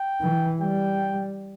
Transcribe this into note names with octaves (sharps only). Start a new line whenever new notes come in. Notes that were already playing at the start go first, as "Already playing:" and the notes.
Already playing: G5
E3
G3 G5